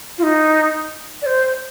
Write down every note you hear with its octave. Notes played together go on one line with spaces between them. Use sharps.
F4
D#4
D5
C5